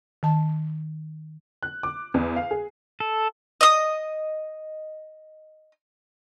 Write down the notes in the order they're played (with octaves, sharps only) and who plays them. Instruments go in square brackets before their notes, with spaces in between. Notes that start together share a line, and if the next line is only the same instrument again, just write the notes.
[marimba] D#3 A5
[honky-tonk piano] F#6
D6
E2
F5
G#4
[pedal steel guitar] A4
[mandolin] D#5 D#6